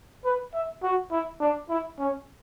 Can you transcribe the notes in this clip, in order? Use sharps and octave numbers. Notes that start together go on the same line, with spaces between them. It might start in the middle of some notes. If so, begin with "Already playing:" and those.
B4
E5
F#4
E4
D4
E4
C#4